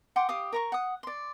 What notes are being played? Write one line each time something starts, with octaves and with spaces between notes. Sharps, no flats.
F#5 G5 C6 D6
G4 F5 D6 D#6
A#4 A#5 C#6
F#5 D#6
D5 C6